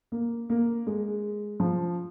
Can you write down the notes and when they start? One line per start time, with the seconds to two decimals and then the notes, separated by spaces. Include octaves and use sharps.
0.12 A#3
0.50 A#3
0.87 G#3
1.60 F3